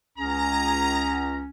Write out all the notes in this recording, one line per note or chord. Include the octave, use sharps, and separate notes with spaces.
C#2 C#4 G#4 A#5